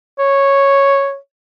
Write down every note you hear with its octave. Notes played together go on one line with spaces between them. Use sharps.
C#5